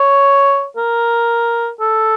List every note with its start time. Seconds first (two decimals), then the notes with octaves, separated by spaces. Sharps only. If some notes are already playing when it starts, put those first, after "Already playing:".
Already playing: C#5
0.77 A#4
1.81 A4